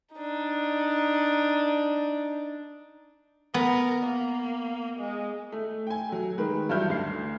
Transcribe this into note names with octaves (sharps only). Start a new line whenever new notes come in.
D4 D#4
B3 A#4
A#3
G#3
A3
G5 G#5
F#3 A3
D#3 G#3 A#4 B4
G2 E3 F#3 E5 F6 G6
D2 C7